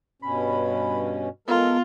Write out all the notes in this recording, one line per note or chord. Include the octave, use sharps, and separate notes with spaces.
G2 B2 C#4 B5
G#3 B3 F4 A4 A#4